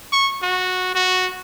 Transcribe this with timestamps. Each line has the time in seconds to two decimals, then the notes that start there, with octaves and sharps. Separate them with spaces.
0.12 C#6
0.42 F#4
0.95 F#4